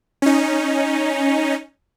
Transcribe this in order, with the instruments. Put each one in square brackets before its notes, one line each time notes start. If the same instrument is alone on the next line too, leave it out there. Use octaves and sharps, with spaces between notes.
[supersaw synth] C#4 D#4